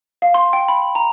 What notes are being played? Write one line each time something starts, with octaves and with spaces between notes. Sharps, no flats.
F5
C6
G5
B5
A#5